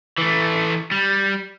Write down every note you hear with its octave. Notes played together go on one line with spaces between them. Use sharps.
E3 A3
G3